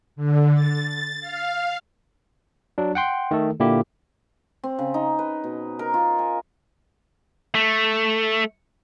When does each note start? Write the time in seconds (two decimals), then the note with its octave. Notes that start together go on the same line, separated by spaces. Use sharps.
0.16 D3
0.54 A6
1.21 F5
2.78 F#3 D4
2.95 F#5 G5 C6
3.31 D#3 A3 A4
3.60 A#2 D3 A#3 E4 G4
4.64 C4
4.79 C#3
4.94 D#4
5.19 B4
5.44 B2
5.79 A#4
5.94 F4
6.19 G#5
7.55 A3